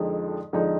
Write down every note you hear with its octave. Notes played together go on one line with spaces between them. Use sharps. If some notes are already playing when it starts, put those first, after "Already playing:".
Already playing: F2 D3 F3 G#3 D#4
F2 D3 F3 G#3 D#4